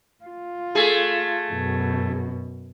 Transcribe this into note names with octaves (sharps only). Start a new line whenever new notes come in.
F4
A3 G#4
F#2 B2